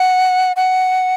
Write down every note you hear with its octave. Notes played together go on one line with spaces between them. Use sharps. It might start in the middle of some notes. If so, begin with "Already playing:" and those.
Already playing: F#5
F#5